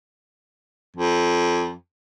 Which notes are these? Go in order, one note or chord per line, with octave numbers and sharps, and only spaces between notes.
F2